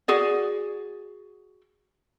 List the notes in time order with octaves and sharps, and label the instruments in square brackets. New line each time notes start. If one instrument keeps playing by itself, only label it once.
[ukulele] F#4 G#4 D5